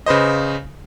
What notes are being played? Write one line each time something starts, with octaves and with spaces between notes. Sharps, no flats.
C#3 B4 C5 D#5